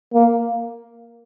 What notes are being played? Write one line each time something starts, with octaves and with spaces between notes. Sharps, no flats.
A#3